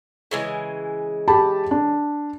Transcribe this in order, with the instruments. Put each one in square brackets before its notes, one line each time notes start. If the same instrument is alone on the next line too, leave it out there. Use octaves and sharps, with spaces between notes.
[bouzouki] C#3 E3 G#3
[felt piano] G4 A5 B5
D4